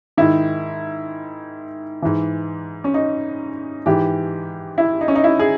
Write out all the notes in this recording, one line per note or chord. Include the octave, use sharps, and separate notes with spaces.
G#2 D#3 E4
G#2 E3
C#4
D#4
G#2 E3 G4
E4
D#4
C#4
D#4
E4
G#4